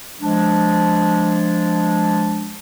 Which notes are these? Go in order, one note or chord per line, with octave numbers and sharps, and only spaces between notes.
F3 G#3 D4